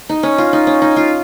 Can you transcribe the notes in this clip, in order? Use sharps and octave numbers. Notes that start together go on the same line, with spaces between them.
D#4
C#4
F4
D#4
C#4
D#4
F4